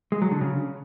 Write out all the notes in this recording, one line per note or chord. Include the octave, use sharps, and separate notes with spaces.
G#3
F#3
D3
C#3